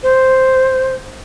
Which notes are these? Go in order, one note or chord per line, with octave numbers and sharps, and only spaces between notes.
C5